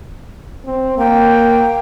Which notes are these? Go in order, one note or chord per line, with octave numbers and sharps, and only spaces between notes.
C4
A#3 G5